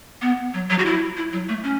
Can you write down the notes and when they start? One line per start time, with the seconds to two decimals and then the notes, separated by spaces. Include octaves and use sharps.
0.22 B3
0.54 F#3
0.70 F#3
0.79 F#4
0.85 E4
1.17 E4
1.33 F#3
1.49 A3
1.64 C#4